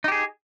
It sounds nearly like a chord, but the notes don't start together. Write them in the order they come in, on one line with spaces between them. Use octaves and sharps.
D#4 G4 G#4